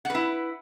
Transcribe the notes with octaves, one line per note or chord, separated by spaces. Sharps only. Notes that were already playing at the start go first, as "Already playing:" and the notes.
E4 B4 F#5